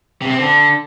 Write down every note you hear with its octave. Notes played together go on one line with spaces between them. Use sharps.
C3
C4
D3